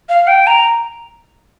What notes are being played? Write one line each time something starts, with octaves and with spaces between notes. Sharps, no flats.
F5
G5
A#5